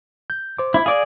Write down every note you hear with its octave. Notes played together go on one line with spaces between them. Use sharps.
G6
C5 D6
E4
G#4 D5 F5 D6